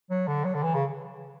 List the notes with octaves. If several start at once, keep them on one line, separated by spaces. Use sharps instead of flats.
F#3
D3
F#3
D3
E3
C#3